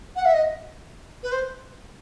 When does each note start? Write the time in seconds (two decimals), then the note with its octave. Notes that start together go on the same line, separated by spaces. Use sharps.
0.15 F#5
0.25 E5
0.33 D#5
1.22 B4
1.31 C5